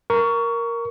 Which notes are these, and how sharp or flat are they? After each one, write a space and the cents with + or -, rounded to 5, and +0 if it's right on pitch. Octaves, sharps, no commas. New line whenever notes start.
A#4 +0 C#6 +20